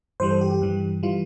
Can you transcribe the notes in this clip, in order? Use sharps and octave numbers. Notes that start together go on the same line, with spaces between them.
G2 E3 G3 C5
A4
G4
G4
G2 E3 G3
E3 G3 F4